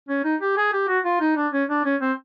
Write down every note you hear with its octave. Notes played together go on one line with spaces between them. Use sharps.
C#4
D#4
G4
G#4
G4
F#4
F4
D#4
D4
C#4
D4
C#4
C4